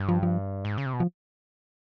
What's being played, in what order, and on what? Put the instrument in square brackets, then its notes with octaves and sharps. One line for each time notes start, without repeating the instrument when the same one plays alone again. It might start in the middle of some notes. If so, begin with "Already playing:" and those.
Already playing: [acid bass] G2
[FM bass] F3
F3
[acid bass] G#2
C#3
C3
B2
[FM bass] F3